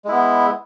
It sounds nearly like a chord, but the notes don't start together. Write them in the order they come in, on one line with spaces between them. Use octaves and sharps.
G#3 E4 B3